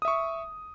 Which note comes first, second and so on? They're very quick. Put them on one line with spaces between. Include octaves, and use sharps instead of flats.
D#6 E5 C#6